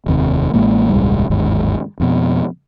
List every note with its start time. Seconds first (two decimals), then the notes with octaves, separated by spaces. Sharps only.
0.06 F1 D#2 C3
0.54 A1 A2 G#3 A#3
0.89 D#1 C2 G#2 G3
1.30 G1 D#2 G#2
2.00 F2 B2